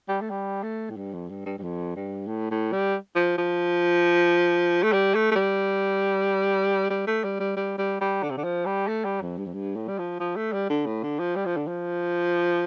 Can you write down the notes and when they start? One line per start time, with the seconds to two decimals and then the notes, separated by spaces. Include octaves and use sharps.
0.08 G3
0.21 A3
0.30 G3
0.63 A3
0.90 A2
0.97 G2
1.13 F2
1.29 G2
1.46 G2
1.58 G2
1.62 F2
1.96 G2
2.28 A2
2.51 A2
2.72 G3
3.16 F3
3.38 F3
4.83 A3
4.92 G3
5.14 A3
5.31 A3
5.36 G3
6.90 G3
7.07 A3
7.24 G3
7.40 G3
7.56 G3
7.78 G3
8.01 G3
8.23 D3
8.30 C3
8.37 D3
8.44 F3
8.66 G3
8.87 A3
9.05 G3
9.21 F2
9.38 G2
9.46 F2
9.53 G2
9.76 A2
9.88 G3
9.99 F3
10.20 F3
10.36 A3
10.53 G3
10.70 D3
10.86 A2
11.03 D3
11.19 F3
11.36 G3
11.46 F3
11.57 D3
11.68 F3